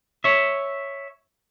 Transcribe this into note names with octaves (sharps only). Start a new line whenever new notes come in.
C#5 E5